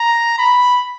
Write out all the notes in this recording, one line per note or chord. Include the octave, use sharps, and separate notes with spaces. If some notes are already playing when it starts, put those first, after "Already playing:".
Already playing: A#5
B5